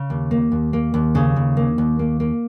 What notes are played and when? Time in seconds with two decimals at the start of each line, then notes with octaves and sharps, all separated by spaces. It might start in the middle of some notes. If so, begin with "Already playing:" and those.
Already playing: C#3
0.10 D#2
0.31 A#3
0.52 D#2
0.73 A#3
0.94 D#2
1.15 C#3
1.36 D#2
1.57 A#3
1.78 D#2
1.99 A#3
2.20 A#3